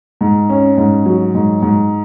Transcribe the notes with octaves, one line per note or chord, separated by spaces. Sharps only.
G#2
C#4
G#2
F#3
G#2
G#2